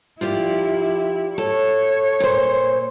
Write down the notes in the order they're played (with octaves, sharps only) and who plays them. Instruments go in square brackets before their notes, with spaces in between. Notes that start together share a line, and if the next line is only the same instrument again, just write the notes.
[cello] F3 E4 [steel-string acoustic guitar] F4 G4 D5
[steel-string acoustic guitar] A4 [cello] C#5
[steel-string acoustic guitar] A#2 C5